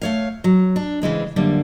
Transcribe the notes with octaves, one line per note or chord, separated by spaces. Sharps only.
A3 C#5 F5
F#3
D4
C#3 E3 G#3 C4
F#2 D3 G3 A#3